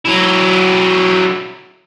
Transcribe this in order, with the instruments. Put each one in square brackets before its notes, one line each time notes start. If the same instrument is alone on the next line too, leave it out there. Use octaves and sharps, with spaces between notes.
[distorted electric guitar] F#3 E4